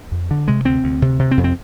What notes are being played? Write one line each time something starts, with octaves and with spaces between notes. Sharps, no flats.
F2
D3
C3 G#3
D2 C4
D2
C3
C3
C4
F2
C4